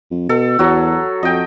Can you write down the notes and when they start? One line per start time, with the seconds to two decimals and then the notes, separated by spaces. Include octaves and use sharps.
0.11 F2
0.29 B2 A4
0.59 E2 F#3 F#4
1.23 F2 D#5 G5